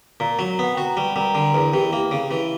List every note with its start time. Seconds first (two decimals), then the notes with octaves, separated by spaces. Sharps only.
0.20 A#2 A#4 A#5
0.39 F#3
0.59 B3 F#5
0.74 F#4 G5
0.86 A#5
0.97 G3 B4 B5
1.16 G3 A#4 A#5
1.34 D3 A#4 A#5
1.54 E2 A#4 A#5
1.73 E3 G4 G5
1.93 A#3
2.11 C#3
2.31 E3